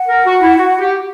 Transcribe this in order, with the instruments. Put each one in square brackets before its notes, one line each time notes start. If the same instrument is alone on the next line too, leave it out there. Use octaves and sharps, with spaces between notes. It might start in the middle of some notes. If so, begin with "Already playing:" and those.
Already playing: [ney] F#5
[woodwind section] A#4
F#4
E4
F#4
G4